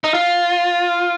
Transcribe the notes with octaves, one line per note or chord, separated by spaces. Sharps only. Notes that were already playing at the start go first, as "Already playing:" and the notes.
D#4
F4